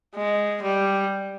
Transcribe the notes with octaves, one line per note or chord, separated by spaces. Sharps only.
G#3
G3